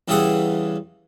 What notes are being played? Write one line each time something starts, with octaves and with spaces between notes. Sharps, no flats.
E2 C#3 G3 G#4 E5 F#5